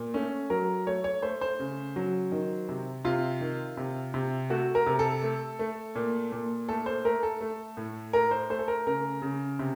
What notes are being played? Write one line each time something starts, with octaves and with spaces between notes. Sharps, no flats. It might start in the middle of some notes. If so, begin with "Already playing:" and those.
Already playing: A#2
A3 C#4
F#3 A#4
A3 C#5
C#5
A3 C5
C5
C#3
F#3
D#3
C3
C3 F4
D#3
C3
C3
A3 F#4
A#4
C3
A4
A3
A3
A#2
A#2
A3 A4
C5
A3 A#4
A4
A3
A2
A3 A#4
C5
A3 C5
A4
A#4
C#3 A#4
C#3
C3